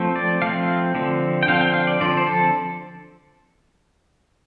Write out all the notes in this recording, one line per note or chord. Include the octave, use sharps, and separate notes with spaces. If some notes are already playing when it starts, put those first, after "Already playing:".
Already playing: F3 A3 C4
D5
F3 A3 C4 F5
D3 F3 C4
G5
D3 F3 C4 F5
G5
F5
D5
D3 F3 C4 D5
C5
A4